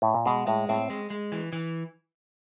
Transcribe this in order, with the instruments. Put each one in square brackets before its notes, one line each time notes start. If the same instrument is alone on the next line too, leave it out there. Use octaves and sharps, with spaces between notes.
[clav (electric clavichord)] A2
A#2
[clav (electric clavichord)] B2 [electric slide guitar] G#3
[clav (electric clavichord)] A2 [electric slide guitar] G#3
[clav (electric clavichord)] A2 [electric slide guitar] C4
[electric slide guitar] G#3
G#3
E3
E3